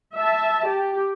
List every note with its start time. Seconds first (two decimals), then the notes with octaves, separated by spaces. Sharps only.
0.15 E5 A5
0.67 G4